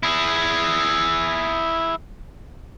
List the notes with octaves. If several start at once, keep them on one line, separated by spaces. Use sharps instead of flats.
E4 G#4